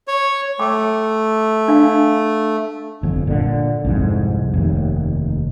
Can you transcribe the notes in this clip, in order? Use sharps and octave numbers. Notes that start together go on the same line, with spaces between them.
C#5
A3 G5 D6
D4 F5
G1 F2
A#2 D3
C2 F2 G#2
F1 D#2